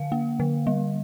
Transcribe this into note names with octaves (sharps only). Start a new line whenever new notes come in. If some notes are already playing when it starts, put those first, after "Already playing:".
Already playing: D3 F5
A#3
D3
G3